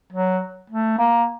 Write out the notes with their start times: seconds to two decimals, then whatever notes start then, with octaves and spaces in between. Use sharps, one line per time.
0.13 F#3
0.70 A3
0.98 A#3